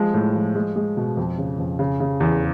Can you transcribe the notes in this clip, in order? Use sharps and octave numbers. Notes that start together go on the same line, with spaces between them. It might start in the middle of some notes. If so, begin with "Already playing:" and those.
Already playing: F3 G#3
A2
F3
G#3
G#3
B2
F2
C#3
F2
C#3
C#3
E2